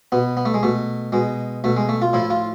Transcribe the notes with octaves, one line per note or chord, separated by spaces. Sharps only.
B2 B3
B3
A3
G#3
B2 A3
B2 G#3
B2 A3
G#3
A3
F4
A2 F3 E4
F4